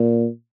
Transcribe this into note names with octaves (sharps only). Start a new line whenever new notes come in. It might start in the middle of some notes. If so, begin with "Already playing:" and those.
Already playing: A#2